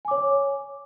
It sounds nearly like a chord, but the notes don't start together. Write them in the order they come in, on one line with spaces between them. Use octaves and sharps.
G#5 D6 C#5